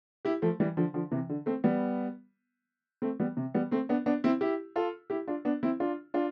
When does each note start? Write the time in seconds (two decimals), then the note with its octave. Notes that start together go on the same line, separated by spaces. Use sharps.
0.25 E4 G4
0.42 F3 A3
0.60 E3 G3
0.77 D3 F3
0.94 D3 F3
1.11 C3 E3
1.29 D3
1.46 A3 C4
1.64 G3 B3
3.02 A3 C4
3.20 G3 B3
3.37 C3
3.54 G3 B3
3.71 A3 C4
3.89 B3 D4
4.06 B3 D4
4.24 C4 E4
4.41 E4 G4
4.76 F4 A4
5.10 E4 G4
5.28 D4 F4
5.45 B3 D4
5.63 C4 E4
5.80 D4 F4
6.14 D4 F4